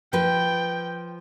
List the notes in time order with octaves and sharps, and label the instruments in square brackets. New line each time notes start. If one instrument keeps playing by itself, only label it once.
[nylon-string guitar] F3 B4 [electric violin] G5